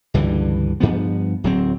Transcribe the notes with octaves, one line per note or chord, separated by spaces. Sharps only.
C#2 G2 D3 E3
G2 F3 B3
D1 F#3 C4